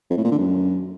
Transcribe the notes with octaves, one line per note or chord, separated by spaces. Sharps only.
F2
A2
A#2
D3
F#2